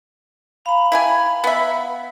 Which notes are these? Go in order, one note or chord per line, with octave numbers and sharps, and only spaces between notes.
F5 A#5 B5
E4 G4 G#5 B5
B3 E5